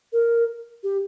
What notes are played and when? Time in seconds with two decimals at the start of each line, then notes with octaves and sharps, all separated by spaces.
0.13 A#4
0.83 G4